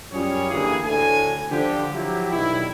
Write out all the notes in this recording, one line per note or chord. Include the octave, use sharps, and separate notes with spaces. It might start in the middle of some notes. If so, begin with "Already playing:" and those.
F#2 G3 C#4 F4 G#4 C#5
D3 E3 A#3 G4 G#4
D2 A2 D3 A4 G#5
D3 F3 G4
F3 F#3 E4 G4
B1 G2 D#3 E4